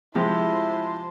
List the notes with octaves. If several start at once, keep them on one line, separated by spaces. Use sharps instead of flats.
C3 F3 G#3 E4 G4 C5 A5